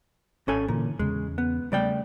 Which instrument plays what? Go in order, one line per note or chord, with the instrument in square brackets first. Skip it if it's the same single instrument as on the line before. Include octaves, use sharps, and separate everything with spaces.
[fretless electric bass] G#1 [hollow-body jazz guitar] C#4 A4 G#5
[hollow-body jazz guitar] A#2 [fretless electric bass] D3 E3
[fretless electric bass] E2 C#3 [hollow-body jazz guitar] G#3
[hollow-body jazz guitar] B3
[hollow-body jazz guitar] C#3 D5 G5 [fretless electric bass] G3 A3